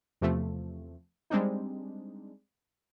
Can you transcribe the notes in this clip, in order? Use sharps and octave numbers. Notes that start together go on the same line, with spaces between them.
E2 C3 F3 A3
G3 G#3 C4 D4 D#4